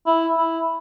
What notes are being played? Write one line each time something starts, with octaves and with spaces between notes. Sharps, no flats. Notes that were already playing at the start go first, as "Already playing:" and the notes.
E4
E4